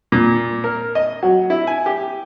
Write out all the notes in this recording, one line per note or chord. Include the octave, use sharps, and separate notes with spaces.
A#2
A#4
D#5
F#3
E4
G#5
G4